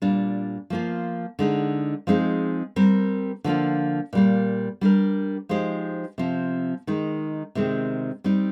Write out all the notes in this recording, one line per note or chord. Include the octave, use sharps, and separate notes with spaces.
A#2 G3 D4
F3 A#3 F4
D3 G#3 D#4
F3 G#3 C4 D#4 G#4
G3 C4 G4 A#4
D3 F3 A#3 F4
A#2 G3 A#3
G3 D4 G4 A#4
F3 G#3 D#4 G4 C5
C3 F3 C4
D#3 G#3 D#4
C3 D#3 G#3 C4
G3 C4 D#4